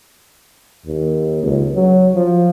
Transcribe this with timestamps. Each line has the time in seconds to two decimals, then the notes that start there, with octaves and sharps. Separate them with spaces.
0.86 D#2
1.43 C#2
1.75 F#3
2.15 F3